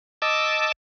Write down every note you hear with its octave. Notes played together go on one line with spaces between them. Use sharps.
D#5 A5 D6 E6